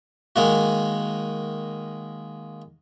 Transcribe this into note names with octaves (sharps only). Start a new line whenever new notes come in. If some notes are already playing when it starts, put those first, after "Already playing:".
D#3 G#3 A#3 F#4